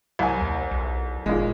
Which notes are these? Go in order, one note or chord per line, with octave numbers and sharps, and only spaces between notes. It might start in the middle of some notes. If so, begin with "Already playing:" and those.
C2 F#3 A#4 G#5
D#2
B1
G1 A#2 D#3 G#3